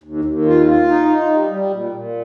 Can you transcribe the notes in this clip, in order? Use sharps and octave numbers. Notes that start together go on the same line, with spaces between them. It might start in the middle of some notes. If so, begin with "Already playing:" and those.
D#2
D#2
F4
F4
D#4
D#4
G3
G3
A#2
A#2